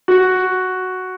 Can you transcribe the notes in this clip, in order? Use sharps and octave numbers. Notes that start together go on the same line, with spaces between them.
F#4